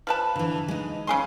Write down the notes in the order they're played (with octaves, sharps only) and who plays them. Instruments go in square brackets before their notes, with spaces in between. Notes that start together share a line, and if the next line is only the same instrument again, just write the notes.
[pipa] F3 B4 A5
[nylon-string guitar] D3 E3
G#3 D#4
[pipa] C#3 G#4 C6